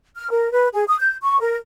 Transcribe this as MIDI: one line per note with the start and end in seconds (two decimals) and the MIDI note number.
0.15 0.30 89
0.30 0.51 70
0.52 0.68 71
0.73 0.84 68
0.87 0.96 87
0.99 1.15 91
1.21 1.39 85
1.40 1.56 70